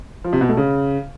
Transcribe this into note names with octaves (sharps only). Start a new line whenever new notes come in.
F3
C3
B2
A3
C#3